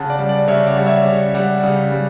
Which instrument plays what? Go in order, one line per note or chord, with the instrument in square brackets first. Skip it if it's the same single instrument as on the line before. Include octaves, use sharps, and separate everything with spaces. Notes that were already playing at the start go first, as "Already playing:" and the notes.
Already playing: [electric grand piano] C#3 F#5 A5
D5
G3
D5
C#3 C#5 E5
D5 F#5
G3
C#5 E5
C#3 D5
G3 D5 F#5
C#3
G3